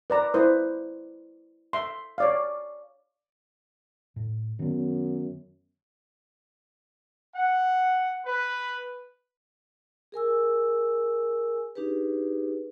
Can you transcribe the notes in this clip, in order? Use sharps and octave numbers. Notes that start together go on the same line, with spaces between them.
B4 D5 A#5
E4 B4 C5 D#6
E5 C6
C#5 D5 F5
A2
F#2 D#3 B3
F#5
B4
G#4 A#4 G#5 E6
D4 D#4 G4 G#4 B4